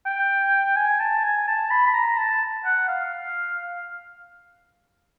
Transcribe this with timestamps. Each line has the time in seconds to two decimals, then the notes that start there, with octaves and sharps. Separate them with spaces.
0.06 G5
0.76 G#5
1.00 A5
1.24 G#5
1.47 A5
1.70 B5
1.86 B5
1.94 A#5
2.17 A5
2.65 F#5
2.88 F5